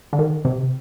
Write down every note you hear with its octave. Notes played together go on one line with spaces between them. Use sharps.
D3
D#3
C3